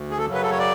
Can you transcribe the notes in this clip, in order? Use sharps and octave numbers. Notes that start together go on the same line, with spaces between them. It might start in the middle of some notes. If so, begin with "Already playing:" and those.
Already playing: D2
G#4
A4
F#2 C#3 F#3
B4
A4
C#5
D5